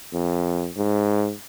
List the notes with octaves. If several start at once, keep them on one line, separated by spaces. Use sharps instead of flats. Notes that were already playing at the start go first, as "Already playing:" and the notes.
F2
G#2